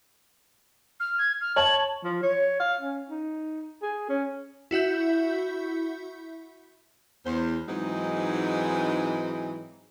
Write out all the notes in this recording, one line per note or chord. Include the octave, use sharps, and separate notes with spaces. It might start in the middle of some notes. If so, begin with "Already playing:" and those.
F6
G#6
F6
C#5 A5 F#7
F3
C#5
F5
C#4
D#4
G#4
C#4
E4 F#4 E5 G6
E2 C5
G#2 E3 F#3 G#3 C4 D#4